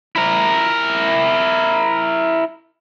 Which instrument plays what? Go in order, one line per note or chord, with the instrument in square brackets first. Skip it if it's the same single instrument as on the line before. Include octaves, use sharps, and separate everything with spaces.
[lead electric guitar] E4 A#4